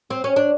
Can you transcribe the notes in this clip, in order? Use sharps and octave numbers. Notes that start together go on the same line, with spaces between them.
C4
C#4
D4